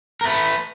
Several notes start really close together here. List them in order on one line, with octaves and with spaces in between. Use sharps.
A#4 A3 B4